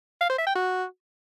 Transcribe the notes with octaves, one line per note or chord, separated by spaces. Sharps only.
F5
C5
E5
G5
F#4